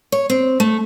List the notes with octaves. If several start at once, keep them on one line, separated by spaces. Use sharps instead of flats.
C#5
C4
A3